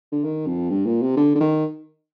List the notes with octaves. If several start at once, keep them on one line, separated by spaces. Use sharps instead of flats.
D3
D#3
F2
G2
A#2
C3
D3
D3
D#3